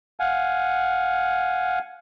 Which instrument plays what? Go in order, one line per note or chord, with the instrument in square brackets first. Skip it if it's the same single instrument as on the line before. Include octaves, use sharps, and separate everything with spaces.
[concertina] F5 F#5 G#5